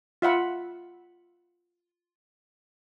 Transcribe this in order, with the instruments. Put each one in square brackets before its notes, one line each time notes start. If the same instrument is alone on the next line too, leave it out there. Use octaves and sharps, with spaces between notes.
[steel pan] F4 E5 F#5 B5